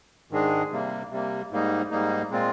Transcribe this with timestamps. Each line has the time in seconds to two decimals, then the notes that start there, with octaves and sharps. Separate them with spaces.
0.31 G#2 D#3 G#3 D4 G#4
0.71 C3 G3 A#3
1.10 C3 G3 A#3
1.51 G#2 G3 A#3 D#4
1.90 G#2 G3 A#3 D#4
2.31 A#2 G#3 C4 F4